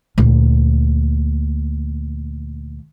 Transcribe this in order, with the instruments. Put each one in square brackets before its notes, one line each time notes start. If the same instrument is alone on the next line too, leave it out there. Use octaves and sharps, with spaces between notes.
[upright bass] D2 A#2